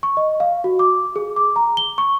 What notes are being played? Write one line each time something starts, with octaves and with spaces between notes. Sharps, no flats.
C#6
D#5
F5
F#4
D6
G#4
D6
A#5
G7
C#6